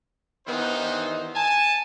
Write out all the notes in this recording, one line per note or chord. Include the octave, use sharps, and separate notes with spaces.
G2 D#3 E3 B3 D#4 C5
G#5 A5